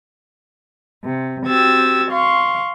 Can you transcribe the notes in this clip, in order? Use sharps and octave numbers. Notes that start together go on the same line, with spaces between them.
C3
C4 F#4 G4 E6 G#6 A6
F5 C6 C#6